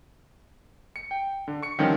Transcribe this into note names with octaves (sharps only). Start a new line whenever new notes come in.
C#7
G5
D3
C#6 C#7
D3 D#3 F3 G3 C4 C#4